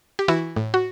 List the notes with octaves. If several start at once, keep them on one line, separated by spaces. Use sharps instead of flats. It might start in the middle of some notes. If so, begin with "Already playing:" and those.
G4
E3 E4 F#4
A2
F#4